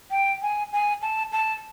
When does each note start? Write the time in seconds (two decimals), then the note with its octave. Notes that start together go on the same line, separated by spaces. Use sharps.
0.11 G5
0.42 G#5
0.73 G#5
1.02 A5
1.32 A5